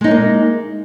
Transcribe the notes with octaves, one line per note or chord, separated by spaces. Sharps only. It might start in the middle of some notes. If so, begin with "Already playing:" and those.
G#3 A#3 C#4 D#4